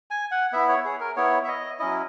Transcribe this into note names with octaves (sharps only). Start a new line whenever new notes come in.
G#5
F#5
B3 E4 E5
C#5
G#4
A#4
B3 E4 C#5
E5
D#5
F#3 C#4 E4 D#5